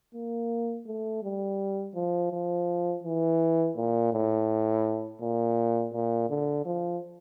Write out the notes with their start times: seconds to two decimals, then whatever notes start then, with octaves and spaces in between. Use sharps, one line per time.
0.14 A#3
0.86 A3
1.23 G3
1.95 F3
2.32 F3
3.03 E3
3.76 A#2
4.13 A2
5.21 A#2
5.93 A#2
6.30 D3
6.65 F3